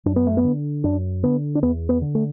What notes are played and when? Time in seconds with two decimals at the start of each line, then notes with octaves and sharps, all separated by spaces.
0.05 F#2 D4
0.16 B3
0.27 A3
0.37 B3
0.45 D3
0.84 F#2 D4
1.23 D3 B3
1.55 D4
1.63 E2 B3
1.89 B3
2.02 D3
2.15 A3